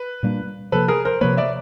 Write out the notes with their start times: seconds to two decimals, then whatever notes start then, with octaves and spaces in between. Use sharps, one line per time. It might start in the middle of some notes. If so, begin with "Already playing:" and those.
Already playing: B4
0.23 A#2 G3 A#3 D4
0.72 C3 F3 A#3 A4 B4
0.88 G#4 A#4
1.05 A#4 C5
1.21 C3 F3 A#3 B4 C#5
1.37 D5 E5